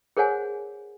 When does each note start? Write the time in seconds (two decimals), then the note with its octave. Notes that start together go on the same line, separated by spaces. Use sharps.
0.17 G#4 A#4 C5 C#5 F#5 G#5